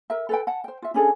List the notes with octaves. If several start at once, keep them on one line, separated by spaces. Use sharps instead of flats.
A#4 E5
A4 B4 G5
F#5 A5
C5 G5
F4 E5
C#4 D4 G#4 A4